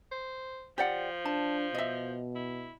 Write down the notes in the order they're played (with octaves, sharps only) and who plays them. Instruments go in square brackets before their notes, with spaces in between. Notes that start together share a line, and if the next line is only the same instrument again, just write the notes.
[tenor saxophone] C5
[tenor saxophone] F3 [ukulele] G4 D5 F#5
[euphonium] D4 [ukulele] A5
[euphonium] B2 [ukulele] D#5 E5
[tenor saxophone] E4